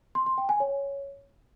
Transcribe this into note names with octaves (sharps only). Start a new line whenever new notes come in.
C6
C6
G5
G#5
C#5